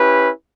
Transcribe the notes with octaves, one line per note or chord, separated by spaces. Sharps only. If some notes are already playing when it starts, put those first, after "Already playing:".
Already playing: C#4 E4 G4 B4